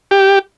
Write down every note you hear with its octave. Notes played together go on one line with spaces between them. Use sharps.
G4